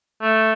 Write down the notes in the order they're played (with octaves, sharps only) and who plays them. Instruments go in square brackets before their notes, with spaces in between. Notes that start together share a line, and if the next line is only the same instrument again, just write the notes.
[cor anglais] A3